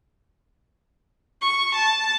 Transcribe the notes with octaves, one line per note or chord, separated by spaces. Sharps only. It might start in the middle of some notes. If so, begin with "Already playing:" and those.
C#6
A5